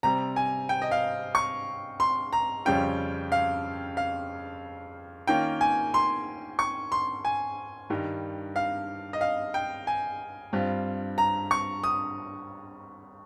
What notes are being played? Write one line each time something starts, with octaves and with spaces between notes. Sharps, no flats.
C3 G3 C4 A#5
G#5
G5
D#5
F5
C#6
C6
A#5
F2 C#3 G3 C#4 F4 G5
F5
F5
D#3 A#3 C#4 F4 G5
G#5
C6
C#6
C6
G#5
G2 D#3 G3
F5
D#5
F5
G5
G#5
G2 G3 C4 F4
A#5
C#6
D#6